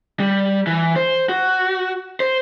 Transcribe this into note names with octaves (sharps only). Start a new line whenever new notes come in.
G3
E3
C5
F#4
C5